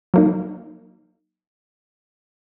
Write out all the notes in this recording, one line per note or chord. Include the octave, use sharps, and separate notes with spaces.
F#3 A#3 D#4